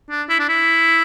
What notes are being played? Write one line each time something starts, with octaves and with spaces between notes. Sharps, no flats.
D4
E4
D4
E4